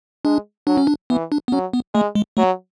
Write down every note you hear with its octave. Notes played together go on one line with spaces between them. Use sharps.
G#3 D4
F#3 D4
C#4
D4
E3 B3
D4
B3
F#3 C#4
B3
G#3 A3
G#3
F#3 A3